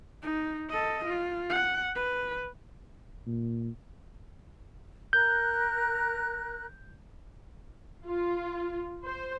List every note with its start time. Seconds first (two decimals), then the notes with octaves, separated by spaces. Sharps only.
0.22 D#4
0.70 A4 D#5
1.05 F4
1.50 F#5
1.96 B4
3.26 A#2
5.13 A#4 F#6 G6
8.06 F4
9.05 C5